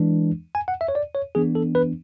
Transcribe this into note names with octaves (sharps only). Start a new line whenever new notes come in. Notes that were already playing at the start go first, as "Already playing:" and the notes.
Already playing: E3 G#3 D4
G#5
F#5
E5
C#5
D5
C#5
E3 B3 D4 G#4
A4
B4